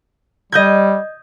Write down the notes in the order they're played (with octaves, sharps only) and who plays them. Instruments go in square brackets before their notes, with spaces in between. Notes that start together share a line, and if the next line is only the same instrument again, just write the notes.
[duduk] G3 [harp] D#5 G6 G#6